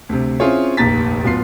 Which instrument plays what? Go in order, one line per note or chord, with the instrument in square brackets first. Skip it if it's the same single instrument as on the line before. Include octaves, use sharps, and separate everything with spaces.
[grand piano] D2 C3
C4 C#4 E4 F4 G#4 C#5
F1 A#1 D#2 A#5 A6 B6
D1 B3 F4 C7